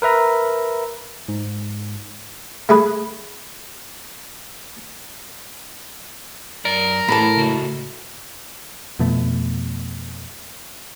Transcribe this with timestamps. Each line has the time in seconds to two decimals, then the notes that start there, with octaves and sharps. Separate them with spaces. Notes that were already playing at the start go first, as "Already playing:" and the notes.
0.02 A#4 B4 E5 A#5
1.29 G#2
2.69 A3 G#4 B4
6.65 F#2 A#4 D5
7.08 A2 A3 A4 B4 A5 B5
7.37 C#3 F#4 A4
8.99 F2 B2 A3